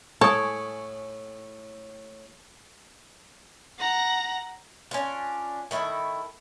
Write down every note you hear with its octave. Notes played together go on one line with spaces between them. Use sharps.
A2 A4 C#5 G#5 D#6
F#5 A#5
C#4 D4 F4
D#3 A3 E4